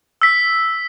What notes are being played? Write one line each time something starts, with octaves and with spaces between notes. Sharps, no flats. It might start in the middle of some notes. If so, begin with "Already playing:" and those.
E6 B6